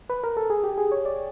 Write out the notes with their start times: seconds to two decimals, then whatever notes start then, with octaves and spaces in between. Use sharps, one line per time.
0.10 B4
0.23 A#4
0.37 A4
0.50 G#4
0.64 G4
0.78 G#4
0.92 C#5
1.05 D5